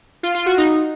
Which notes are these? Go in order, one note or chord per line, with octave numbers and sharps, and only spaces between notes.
F4
F4
F#4
D#4